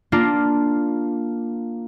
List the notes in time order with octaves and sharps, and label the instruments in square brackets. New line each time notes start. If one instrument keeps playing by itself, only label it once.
[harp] A#3 D4 F4